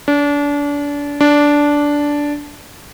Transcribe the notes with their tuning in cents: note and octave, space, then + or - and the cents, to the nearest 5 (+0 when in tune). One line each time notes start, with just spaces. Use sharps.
D4 -30
D4 -10